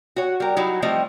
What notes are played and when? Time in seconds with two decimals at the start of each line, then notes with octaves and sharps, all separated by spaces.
0.16 F#4 C#5
0.40 G3 A#4
0.57 F#3 D#4 E4 F#4
0.82 F3 G3 A3 C4 D#5